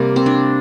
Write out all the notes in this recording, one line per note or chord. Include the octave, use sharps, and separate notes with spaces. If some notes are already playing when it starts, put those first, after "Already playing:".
Already playing: C3 G3 A#3 G4
C4
D4